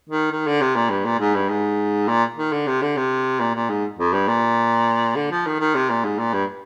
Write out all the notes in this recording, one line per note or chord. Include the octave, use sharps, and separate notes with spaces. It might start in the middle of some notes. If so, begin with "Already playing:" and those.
D#3
D#3
D3
C3
A#2
G2
A#2
G#2
G2
G#2
A#2
D#3
D3
C3
D3
C3
A#2
A#2
G#2
F2
G2
A#2
D3
F3
D#3
D#3
C3
A#2
G#2
A#2
G2